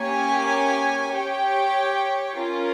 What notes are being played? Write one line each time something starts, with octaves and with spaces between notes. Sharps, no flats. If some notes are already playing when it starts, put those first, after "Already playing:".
Already playing: A#3 C#4 G4 C#5 G#5
G4 C#5 G5
C#4 F4 A#4